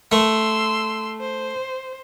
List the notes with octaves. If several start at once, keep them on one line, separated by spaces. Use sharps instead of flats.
A3 C6 E6
C5